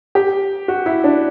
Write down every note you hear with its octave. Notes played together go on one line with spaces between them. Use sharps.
G4
F#4
E4
D4